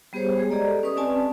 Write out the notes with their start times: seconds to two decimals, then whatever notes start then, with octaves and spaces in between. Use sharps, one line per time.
0.13 G3 B3 G4 G#4 C5 C#5
0.38 G#3 G#4
0.50 G4 A4 D5 D#5 A#5
0.83 C#4 B4 D#5 C#6 D#6
0.97 C4 D5 G#5 A5